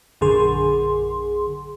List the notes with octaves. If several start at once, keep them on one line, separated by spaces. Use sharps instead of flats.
A#1 F#2 D3 G#4 C6